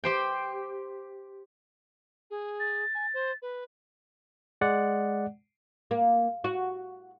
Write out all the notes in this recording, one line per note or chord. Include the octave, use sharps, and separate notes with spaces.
G4 C5 G5
G#4
A6
G#5
C5
B4
G#3 D5 F#5
A#3
F#4